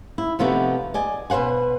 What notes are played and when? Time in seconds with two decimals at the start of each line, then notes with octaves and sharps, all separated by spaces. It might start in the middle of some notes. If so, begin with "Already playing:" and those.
0.18 E4
0.39 C3 F3 A3 B3 D#4 F#4
0.94 D5 D#5 G#5
1.30 B2 B4 C5 F#5 G#5